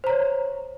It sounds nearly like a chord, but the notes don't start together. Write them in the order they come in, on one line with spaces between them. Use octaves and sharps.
C5 A#5 C#5